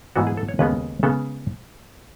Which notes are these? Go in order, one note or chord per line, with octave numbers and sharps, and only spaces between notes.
G#2 E3 B3 F#4
G#4
A4
C#5
D#2 C#3 G#3 B3 B4
C#3 G#3 B3 A4